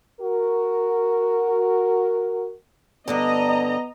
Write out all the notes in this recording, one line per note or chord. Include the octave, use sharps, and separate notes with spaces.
F#4 A#4
G2 D3 B3 D4 D#5 A#5